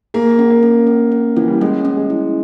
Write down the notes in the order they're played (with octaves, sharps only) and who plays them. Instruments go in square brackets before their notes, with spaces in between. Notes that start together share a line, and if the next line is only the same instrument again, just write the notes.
[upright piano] A#3 [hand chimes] G#4
[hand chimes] C#4
[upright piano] A#3
[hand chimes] C#4
C#4
C#4
[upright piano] E3 [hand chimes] C#4
[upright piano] G3
[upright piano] G#3 [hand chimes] C#4
[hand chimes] C#4
[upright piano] G#3
[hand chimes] E4